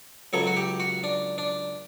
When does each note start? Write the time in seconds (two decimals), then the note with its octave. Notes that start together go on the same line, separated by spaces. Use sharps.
0.33 C#2 C#3 F#3 A4
0.47 F#4
0.57 G4
0.80 F#4
1.04 D4
1.38 D4